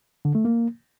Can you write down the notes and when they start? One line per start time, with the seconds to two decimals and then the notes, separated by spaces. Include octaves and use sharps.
0.25 D3
0.35 A3
0.45 A#3